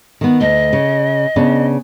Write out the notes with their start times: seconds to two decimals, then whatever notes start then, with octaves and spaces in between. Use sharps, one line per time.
0.21 D#3 B3
0.41 D2 D#5
0.73 C#3
1.36 C#3 B3 D4